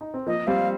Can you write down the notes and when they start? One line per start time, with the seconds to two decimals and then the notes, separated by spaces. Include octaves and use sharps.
0.01 D#4
0.14 C4
0.27 F3 A#3 D#5
0.47 G3 C4 F5